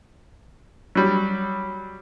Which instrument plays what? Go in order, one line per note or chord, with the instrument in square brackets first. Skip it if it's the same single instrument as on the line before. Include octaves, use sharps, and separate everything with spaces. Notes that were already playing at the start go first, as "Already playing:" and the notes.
[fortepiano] F#3 G3